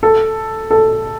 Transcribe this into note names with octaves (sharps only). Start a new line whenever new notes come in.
A4
A4